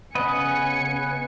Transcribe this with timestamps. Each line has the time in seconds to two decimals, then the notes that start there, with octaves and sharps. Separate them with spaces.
0.15 C#3 B3 B4 D#5 G#5 C#7